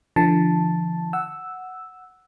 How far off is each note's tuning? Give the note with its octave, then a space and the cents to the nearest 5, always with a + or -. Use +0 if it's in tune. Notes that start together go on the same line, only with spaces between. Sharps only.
D3 +0 F3 -35 A5 +0
F#5 +0 E6 +0